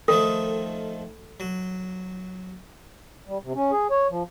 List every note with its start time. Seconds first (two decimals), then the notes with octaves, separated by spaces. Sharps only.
0.08 D#3 F3 A3 A4
1.40 F#3
3.27 G3
3.44 C3
3.55 C#4
3.72 G#4
3.91 C#5
4.10 F3